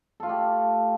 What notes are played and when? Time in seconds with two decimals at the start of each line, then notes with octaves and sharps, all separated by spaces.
0.20 A4
0.23 F4
0.26 A3
0.29 G4